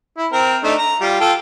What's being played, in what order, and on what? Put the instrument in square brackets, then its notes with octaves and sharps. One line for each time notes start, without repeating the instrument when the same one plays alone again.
[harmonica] E4
C4 A#4
A3 D4 D#4
A#5
G3 F4
F4 A4 G5